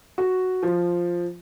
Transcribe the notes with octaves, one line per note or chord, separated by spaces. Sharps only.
F#4
F3